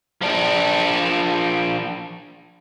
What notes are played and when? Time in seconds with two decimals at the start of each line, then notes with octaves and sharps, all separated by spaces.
0.22 F3 D4